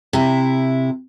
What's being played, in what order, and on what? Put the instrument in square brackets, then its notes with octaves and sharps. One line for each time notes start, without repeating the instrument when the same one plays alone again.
[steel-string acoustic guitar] C3 E4